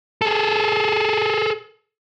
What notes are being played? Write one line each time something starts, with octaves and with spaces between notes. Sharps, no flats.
G#4 A4